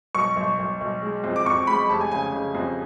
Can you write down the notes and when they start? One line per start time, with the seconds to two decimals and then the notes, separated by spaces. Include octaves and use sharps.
0.15 B1 C#6
0.36 B1
0.59 B1
0.81 B1
1.02 G#3
1.24 F2
1.36 D6
1.46 F2 C#6
1.67 G#3 B5
1.89 F1 A5
2.01 G#5
2.11 C#3 G#5
2.22 G#5
2.32 C#3
2.55 F2